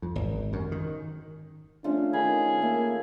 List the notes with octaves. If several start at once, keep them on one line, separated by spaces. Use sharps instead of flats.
F2
G#1
F#2
D#3
F3 A3 C#4 D4
D#3 G#4 B5
A#3 E5